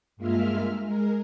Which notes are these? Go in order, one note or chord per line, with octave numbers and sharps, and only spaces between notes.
G2 G#3 A#3 F4 E5 F6
G#3 A#4